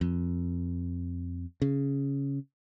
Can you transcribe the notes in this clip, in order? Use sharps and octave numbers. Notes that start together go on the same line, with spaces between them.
F2
C#3